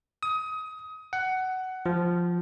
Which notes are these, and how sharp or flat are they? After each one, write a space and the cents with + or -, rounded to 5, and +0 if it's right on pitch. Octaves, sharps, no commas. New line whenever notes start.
D#6 +25
F#5 +15
F3 +0